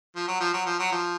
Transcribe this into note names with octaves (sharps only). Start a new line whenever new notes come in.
F3
F#3
F3
F#3
F3
F#3
F3